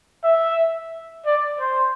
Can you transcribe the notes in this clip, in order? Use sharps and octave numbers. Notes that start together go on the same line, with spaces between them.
E5
D5
C5